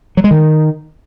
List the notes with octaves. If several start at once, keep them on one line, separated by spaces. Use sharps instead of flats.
F#3
G#3
D#3